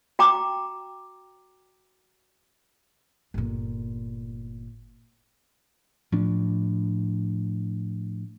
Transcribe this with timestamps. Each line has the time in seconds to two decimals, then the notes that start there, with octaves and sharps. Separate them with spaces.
0.19 F#4 G5 A#5 D6
3.34 G1 A#2
6.12 A2 F3 D4